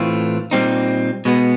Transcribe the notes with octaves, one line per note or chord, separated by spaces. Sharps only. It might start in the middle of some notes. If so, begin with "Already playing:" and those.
Already playing: A2 E3 A3 C4 F4
A#2 G3 C4 D#4
B2 G#3 B3